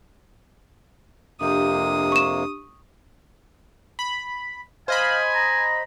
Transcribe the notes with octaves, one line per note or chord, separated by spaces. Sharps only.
F2 C3 A#3 D4 G4 D#6
C#6 E7
B5
C5 D#5 F5 G#5 B5
A#5